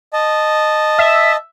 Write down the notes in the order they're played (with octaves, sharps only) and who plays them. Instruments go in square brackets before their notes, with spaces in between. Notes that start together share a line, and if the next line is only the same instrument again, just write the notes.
[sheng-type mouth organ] D#5 A5
[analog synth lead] E5